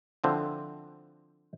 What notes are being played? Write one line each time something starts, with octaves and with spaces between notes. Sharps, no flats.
D3 F3 C4 E4